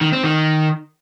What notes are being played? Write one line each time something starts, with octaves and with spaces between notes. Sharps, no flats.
D#3
C4
D#3